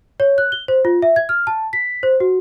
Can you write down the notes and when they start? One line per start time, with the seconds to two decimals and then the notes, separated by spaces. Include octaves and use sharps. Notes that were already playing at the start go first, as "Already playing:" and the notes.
0.20 C#5
0.38 F#6
0.52 G7
0.68 C5
0.85 F4
1.02 E5
1.16 G#6
1.29 F6
1.47 A5
1.73 B6
2.03 C5
2.20 F#4